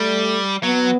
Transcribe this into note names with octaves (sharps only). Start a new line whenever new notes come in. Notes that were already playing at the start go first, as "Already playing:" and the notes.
Already playing: G3 A3
F#3 B3